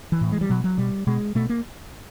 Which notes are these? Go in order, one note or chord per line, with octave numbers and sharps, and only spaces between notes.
E3
A2
G#3
G3
B2 F#3
F#3
B2 G3
B2 G#3
B2 A3
A#3